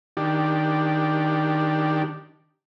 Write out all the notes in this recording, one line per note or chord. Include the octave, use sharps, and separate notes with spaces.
D#3 D4 G4